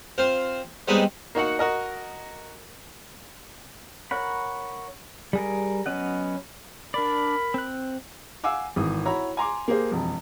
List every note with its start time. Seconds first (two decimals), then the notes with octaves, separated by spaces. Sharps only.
0.18 C4 F4 C5
0.88 G3 G#3 B3 C4 D#4
1.35 A#3 D#4 F#4 F#5
1.59 F#4 A#4 D#5
4.11 A#4 C#5 F#5 B5
5.33 G3 G#4 A#4
5.86 F#3 B3 C#4 D#5 F#5
6.94 D4 A#4 D5 B5
7.54 C4 F#6
8.44 F5 F#5 G#5 D6 E6
8.76 G#1 E3 D#6
9.05 E4 F#4 C#5 A#5 B5
9.37 G#5 A#5 C6 D6
9.68 A#3 G4 G#4 C5
9.91 E1 F2